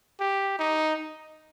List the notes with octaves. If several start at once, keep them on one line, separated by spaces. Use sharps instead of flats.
G4
D#4